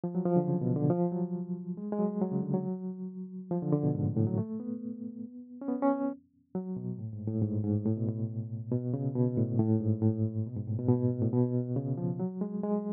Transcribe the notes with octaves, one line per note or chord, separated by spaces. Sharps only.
F3
F#3
F3
D3
C#3
B2
D3
F3
F#3
G#3
G#3
F#3
F#3
C#3
D3
F#3
F3
D3
D3
B2
G#2
A2
A2
F#3
A3
B3
C#4
B3
C#4
F#3
B2
A2
G#2
A2
G#2
G#2
A2
B2
A2
B2
C#3
B2
A2
A2
G#2
A2
B2
G#2
A2
B2
B2
A2
B2
C#3
F3
F#3
G#3
G#3